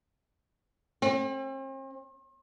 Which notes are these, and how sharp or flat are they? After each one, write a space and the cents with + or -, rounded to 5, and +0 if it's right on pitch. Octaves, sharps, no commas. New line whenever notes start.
C4 +45